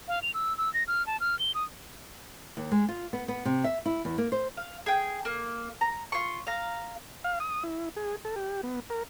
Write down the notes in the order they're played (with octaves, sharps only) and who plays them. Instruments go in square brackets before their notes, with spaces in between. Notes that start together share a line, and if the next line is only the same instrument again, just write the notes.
[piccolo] F5
F7
E6
E6
A#6
F6
A5
F6
G7
D#6
[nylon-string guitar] D#2
G#3
F4
B3
B3
C3
E5
E4
E2
A#3
C5
[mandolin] F5
G#4 G5
A#3
A#5
F4 C#6
F5 A#5
[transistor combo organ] F5
D#6
E4
G#4
A4
G4
B3
A#4